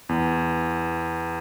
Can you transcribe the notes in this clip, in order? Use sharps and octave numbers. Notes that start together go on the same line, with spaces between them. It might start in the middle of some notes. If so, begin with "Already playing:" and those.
E2